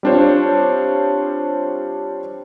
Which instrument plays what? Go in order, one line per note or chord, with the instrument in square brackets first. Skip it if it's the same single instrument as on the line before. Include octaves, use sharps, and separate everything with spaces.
[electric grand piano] G3 C4 D4 F4 C5 C#5